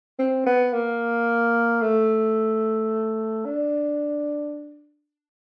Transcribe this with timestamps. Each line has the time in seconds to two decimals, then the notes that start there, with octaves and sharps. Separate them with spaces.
0.19 C4
0.46 B3
0.73 A#3
1.82 A3
3.45 D4